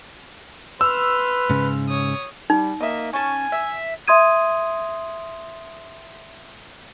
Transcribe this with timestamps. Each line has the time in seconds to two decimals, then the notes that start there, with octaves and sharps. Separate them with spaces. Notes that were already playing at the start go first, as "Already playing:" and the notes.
0.81 B4 C6 E6 F6
1.50 G#2 C#3
1.89 C#5 D#6
2.50 G3 D#4
2.81 A#3 D#5 E5
3.13 C#4 G#5 A5
3.52 E5
4.08 E5 C6 D#6 G#6 D#7